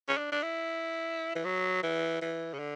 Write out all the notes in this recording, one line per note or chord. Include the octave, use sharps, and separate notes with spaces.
C#4
D4
D4
E4
E3
F#3
E3
E3
C#3
D3